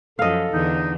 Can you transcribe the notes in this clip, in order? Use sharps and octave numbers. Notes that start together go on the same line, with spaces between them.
F#2 F3 A4 D#5 F5
E2 D3 E3 D#4